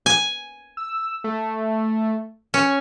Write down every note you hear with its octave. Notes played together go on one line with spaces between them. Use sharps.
G#5
E6
A3
C#4 C#6